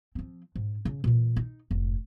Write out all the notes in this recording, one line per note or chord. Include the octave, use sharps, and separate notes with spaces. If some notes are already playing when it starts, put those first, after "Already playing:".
F3 C4
G#2
C#3
A#2 E3
D#4
F1 G#2